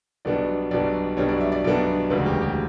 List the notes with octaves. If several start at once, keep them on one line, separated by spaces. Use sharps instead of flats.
B1 B2 G3 B3 D4 D5
B1 B2 G3 B3 D4 D5
B1 B2 G3 B3 D4 C#5
D5
E5
D5
B1 B2 G3 B3 D4 D5
E1 D2 C#3 G3 B4
F#4
G4
G4